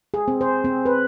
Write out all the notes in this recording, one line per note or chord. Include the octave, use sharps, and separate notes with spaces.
G#4
C4
C5
C4
B4